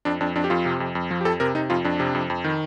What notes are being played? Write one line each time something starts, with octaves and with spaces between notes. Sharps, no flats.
F2 D4
F2 D4
F2 D4
G4
F2 F4
C3
F2
F2
F3
G4
F2 A4
C3 A#4
C3 D#4
F2 F4
F2 D4
C3
F2
F2
D#3